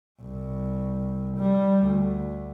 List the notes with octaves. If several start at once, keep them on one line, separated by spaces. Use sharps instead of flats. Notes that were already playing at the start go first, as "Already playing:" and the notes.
C2
G3
D2